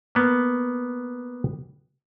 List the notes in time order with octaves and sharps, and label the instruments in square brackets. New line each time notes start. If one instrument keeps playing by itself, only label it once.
[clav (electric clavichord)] A#3 B3